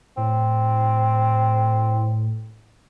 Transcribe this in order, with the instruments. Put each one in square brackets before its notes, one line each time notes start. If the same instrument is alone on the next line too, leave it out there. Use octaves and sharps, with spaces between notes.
[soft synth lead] A2 [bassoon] C4